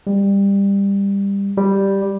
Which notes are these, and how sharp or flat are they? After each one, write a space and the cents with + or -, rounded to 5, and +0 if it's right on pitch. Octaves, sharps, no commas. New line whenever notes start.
G3 +20
G3 +0